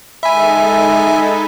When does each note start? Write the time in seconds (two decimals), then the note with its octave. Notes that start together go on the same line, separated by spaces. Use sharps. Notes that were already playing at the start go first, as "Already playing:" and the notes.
0.23 G#3 D#4 A4 E5 G#5 B5